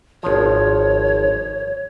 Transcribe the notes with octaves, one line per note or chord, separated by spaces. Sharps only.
G#1 F3 C#5